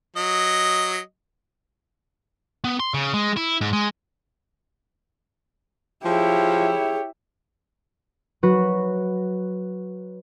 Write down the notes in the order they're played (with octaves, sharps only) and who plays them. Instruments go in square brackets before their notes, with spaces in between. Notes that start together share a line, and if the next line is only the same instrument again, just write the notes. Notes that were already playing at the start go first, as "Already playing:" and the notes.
[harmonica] F#3 D#5
[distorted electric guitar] B3
C6
C#3
G#3
E4
G#2
G#3
[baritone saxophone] F3 [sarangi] E4 [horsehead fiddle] G4 C#5 [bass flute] G#4
[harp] F#3 F#4 B4